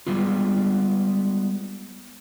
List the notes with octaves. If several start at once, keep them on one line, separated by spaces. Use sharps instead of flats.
G3 G#3 B3 F4